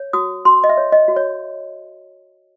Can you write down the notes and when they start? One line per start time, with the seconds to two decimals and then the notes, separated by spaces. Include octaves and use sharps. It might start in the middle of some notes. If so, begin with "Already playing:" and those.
Already playing: C#5
0.13 F#4 D#6
0.45 F#4 C6
0.64 D#5
0.69 E5
0.77 C#5
0.92 D#5
1.08 F#4
1.16 C#5